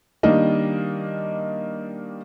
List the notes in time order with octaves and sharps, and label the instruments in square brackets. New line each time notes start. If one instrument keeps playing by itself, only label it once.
[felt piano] D#3 G3 A#3 D4 D#5